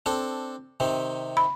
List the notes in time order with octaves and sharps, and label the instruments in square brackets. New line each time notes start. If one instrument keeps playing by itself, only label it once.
[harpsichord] C4 D4 A4
C3 D#3 C4
[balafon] B5